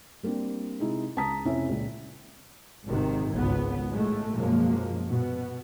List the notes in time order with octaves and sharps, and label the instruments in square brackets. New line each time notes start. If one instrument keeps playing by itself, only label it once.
[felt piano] G3 A#3 C4 D4
C3 G#3 D#4 E4
C#2 A5 A#5 D#6 B6
F1 F2 C#4 E4 E5
C#2 A#2
[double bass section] G#1 C3 D#3
G#1 C#2 B3
A2 G#3 A3
F#2 B2 F3 G#3 A#3
B2 B3